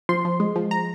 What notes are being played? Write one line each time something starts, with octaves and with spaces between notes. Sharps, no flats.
F3 C6
F3
G#3
F3
A#5